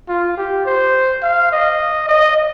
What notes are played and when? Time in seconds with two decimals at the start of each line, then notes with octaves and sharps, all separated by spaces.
0.08 F4
0.37 G4
0.66 C5
1.23 F5
1.52 D#5
2.09 D#5